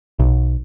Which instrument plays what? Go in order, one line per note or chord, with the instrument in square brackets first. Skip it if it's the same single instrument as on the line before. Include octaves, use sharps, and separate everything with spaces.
[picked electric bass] B1